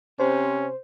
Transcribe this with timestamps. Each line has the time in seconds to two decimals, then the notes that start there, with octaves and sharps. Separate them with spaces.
0.20 C3 C#4 C5